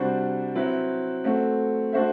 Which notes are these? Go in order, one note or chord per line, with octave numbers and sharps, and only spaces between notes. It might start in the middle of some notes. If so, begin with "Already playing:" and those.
Already playing: C3 G3 D4 F#4 C5
F#3 C4 E4 B4
A3 C4 F#4
A3 D4 F#4 C5 E5